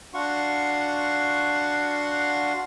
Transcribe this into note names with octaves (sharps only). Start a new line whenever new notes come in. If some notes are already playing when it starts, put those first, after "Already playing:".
D4 F#4 F5 F#5 C6 C#6